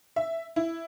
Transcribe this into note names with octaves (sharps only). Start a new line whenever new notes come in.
E5
E4